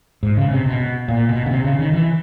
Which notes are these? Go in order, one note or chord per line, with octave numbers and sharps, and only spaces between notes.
G#2
C#3
C3
B2
A#2
B2
C#3
C3
C#3
D#3
E3